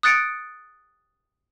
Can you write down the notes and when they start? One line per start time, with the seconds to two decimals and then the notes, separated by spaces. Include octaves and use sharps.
0.03 D#6 F#6 A6 C#7 D7